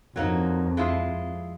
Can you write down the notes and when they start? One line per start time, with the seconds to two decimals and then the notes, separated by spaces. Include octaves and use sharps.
0.16 F2 F#3 A#3 D#4
0.77 G#3 E4 F4